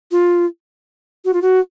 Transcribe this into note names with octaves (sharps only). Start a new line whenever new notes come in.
F4
F#4
F4
F#4